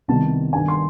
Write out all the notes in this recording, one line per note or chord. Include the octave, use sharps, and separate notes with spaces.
C2 C3 D#3 G3 B3 A5
G1 G2 D#3 G#5
C6